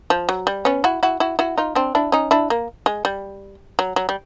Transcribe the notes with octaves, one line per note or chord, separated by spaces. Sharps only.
F3
F#3
G3
B3 C#4
E4 F#4
E4 F#4
E4 F#4
E4 F#4
D#4 F4
C4 D4
D4 E4
C#4 D#4
D4 E4
A#3
G#3
G3
F#3
F#3
G3